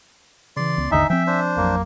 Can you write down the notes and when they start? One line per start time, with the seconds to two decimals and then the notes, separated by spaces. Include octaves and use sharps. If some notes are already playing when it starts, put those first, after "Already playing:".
0.57 C#3 E3 D5 C6
0.78 C#2 B3
0.91 G#1 D#2 D3 D#4 D#5 E5 G#5
1.10 F3 C4 E5 G5
1.27 D4 C5
1.56 A1 F2 F#3 A#3